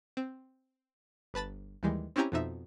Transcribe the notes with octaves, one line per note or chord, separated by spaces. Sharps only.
C4
G1 B4 A5 B5 A6
D#2 E3 G3 G#3
C4 C#4 E4 G4 G#5 A#5
F2 B2 F3 D#4 E5